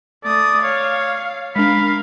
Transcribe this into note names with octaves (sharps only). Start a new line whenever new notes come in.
A3 D5 D#6
C#5 F5
G#3 D4 A#4 F5 B5